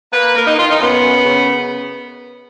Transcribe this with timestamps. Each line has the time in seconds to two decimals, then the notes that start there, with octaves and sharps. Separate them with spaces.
0.13 A#3 B4
0.35 A#3 A#4
0.47 D#4
0.57 D#3 F4
0.69 D#4
0.80 F#2 B3
1.02 F#2
1.25 C#3